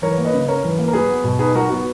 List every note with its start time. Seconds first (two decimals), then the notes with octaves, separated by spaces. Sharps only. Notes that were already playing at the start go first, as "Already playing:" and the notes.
0.02 E3 A#4 C#5
0.18 A#3 C#5
0.25 B4 D#5
0.33 C#3
0.48 C#4 A#4 C#5
0.64 E3
0.79 A#3
0.88 A#4
0.93 F#3 G#4 B4
1.09 B3
1.24 B2
1.39 D#4 G#4 B4
1.55 F#3 F#4 A#4
1.70 B3 F#4